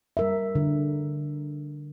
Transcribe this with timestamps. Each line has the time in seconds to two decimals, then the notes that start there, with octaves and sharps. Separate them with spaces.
0.17 G3 A#4 E5
0.55 D3